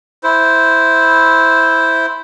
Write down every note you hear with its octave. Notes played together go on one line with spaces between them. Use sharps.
E4 C5